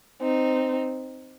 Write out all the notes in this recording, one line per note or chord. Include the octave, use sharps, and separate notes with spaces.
C4 D#4